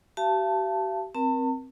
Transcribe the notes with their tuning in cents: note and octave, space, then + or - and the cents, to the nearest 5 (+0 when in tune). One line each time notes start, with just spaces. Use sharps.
G4 -40 F5 -45 A5 +0
C4 +0 A#4 +30 A5 +40